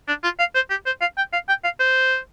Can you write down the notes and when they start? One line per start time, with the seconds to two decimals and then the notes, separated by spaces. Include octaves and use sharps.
0.08 D4
0.24 F4
0.39 F5
0.55 C5
0.70 G4
0.86 C5
1.01 F5
1.17 G5
1.33 F5
1.49 G5
1.64 F5
1.80 C5